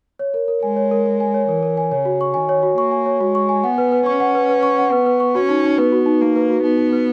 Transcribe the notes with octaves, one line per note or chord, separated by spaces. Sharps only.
C#5
A#4
A#4
G#3 G#5
C#5
A#4
A#4
G#5
C#5
E3 A#4
A#4
G#5
C#3 C#5
F#4
C#6
D#3 G#5
C#5
F#4
A#3 C#6
G#5
C#5
G#3 F#4
C#6
G#5
B3 F#5
B4
B4
C#4 C#6
F#5
B4
B4
C#6
F#5
B3 B4
B4
C#6
C#4 F#4
D#4
D#4
B3 B4
F#4
D#4
A#3 D#4
B4
F#4
B3 D#4
D#4
B4